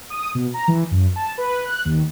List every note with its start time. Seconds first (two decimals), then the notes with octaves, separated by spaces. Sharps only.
0.10 D#6
0.35 B2
0.54 A#5
0.68 E3
0.91 F#2
1.16 A5
1.38 B4
1.65 F#6
1.85 D#2